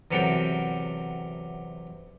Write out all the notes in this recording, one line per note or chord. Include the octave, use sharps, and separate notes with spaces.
E2 C3 F#3 A4 A#4 G5